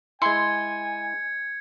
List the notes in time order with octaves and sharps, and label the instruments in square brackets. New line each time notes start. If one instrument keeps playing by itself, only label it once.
[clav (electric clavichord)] G#3 E4 [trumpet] G#5 [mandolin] C6 [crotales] G#6 C#7